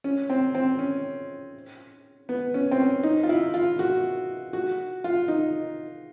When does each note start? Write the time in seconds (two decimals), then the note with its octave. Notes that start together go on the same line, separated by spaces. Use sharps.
0.04 C#4
0.30 C4
0.55 C4
0.79 C#4
2.29 B3
2.54 C#4
2.71 C4
2.80 C#4
3.03 D#4
3.23 F4
3.29 E4
3.54 F4
3.79 F#4
4.53 F#4
5.04 F4
5.28 D#4